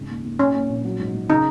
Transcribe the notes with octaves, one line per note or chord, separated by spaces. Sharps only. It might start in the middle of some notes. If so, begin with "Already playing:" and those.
Already playing: G#1 C#3
D#2
D#2
A#2 C#4
A#3
A#1
F#3
G#2
G#2
C#3 D#4